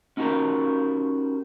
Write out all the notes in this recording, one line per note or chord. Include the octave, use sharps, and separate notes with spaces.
C#4 D#4 F#4 G4 A#4